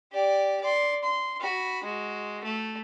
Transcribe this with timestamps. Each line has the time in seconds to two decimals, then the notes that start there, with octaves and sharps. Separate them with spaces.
0.12 G4 D5
0.61 D5 C6
1.04 C6
1.40 F#4 B5
1.83 G#3 F#4
2.44 A3